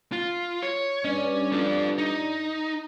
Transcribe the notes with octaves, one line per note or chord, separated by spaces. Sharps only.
F4
C#5
G2 C#4 D5
F4 A4
D#4